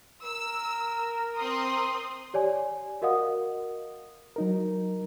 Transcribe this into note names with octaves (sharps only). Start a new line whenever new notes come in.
A#4 E6
C4 C6 D#6
G4 C#5 D5 G#5
F#4 A#4 D#5 F5 F#5 D#6
F#3 D#4 A#4